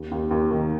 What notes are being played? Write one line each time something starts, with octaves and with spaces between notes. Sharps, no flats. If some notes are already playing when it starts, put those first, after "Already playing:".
Already playing: D#2
D#2
D#2
D#3